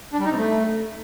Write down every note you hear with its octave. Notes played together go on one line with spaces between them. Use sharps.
D4
G3
D#4
C3
A3